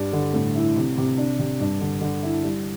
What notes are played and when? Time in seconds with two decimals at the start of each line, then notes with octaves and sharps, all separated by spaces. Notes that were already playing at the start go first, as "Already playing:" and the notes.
Already playing: G2 G3
0.13 D3
0.34 A2
0.56 E4
0.76 C3
0.98 C3
1.18 D4
1.39 C3
1.60 G2
1.80 D3
2.01 D3
2.23 E4
2.44 G3